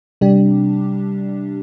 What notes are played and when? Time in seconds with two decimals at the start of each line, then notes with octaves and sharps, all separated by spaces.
0.21 C3 G3 D4 G4